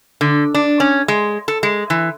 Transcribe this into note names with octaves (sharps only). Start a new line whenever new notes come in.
D3
D4
C#4
G#3
A4
G#3
E3